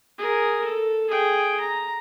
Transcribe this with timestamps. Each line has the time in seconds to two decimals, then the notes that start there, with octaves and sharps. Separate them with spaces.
0.18 G#4 A#4
0.65 A4
1.10 G#4 G5
1.61 A#5